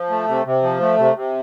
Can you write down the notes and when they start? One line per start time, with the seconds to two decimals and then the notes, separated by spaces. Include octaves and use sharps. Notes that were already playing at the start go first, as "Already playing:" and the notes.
Already playing: F3
0.10 A3
0.28 C3
0.46 C3
0.63 F3
0.81 A3
0.98 C3
1.16 C3